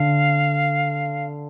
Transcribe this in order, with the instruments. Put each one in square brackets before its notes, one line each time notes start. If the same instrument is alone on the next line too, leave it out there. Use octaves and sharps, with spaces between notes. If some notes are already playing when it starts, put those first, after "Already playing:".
Already playing: [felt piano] D3 [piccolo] F5